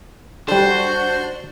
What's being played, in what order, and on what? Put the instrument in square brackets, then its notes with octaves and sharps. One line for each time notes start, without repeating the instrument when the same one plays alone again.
[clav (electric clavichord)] G3 A4 [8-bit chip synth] D4 [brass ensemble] F#4 [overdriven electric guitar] C5